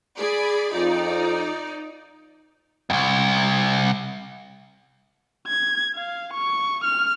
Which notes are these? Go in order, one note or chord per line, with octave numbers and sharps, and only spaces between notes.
G#4 D5 B5
F2 D#4 F4 D5
C2 F2
G#6
F5
C#6
F6